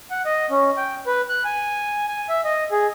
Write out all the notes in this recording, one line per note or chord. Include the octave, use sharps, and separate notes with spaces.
F#5
D#5
C#4
G5
B4
F#6
G#5
G#5
E5
D#5
G#4